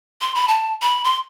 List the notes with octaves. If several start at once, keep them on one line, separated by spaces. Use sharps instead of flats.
C6
B5
A5
B5
C6